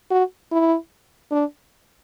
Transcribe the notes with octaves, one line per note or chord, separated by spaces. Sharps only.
F#4
E4
D4